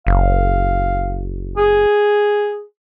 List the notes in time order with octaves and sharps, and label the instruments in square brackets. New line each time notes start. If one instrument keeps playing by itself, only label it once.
[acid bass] F#1 [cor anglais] F5
[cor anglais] G#4